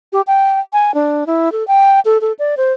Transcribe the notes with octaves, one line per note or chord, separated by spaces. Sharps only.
G4
G5
G#5
D4
E4
A4
G5
A4
A4
D5
C5